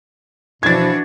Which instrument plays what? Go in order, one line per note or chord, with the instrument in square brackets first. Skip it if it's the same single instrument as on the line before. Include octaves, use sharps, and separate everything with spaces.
[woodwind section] B2 F3 E4 [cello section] E3 D4 F#4 [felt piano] G#6 A6